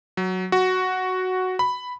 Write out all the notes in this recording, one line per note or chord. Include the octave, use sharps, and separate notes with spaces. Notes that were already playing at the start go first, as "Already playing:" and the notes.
F#3
F#4
B5